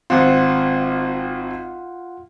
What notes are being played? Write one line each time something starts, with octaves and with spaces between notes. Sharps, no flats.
G#1 C4 F4 F#5